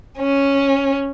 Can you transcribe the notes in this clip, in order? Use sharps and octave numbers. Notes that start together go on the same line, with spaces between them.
C#4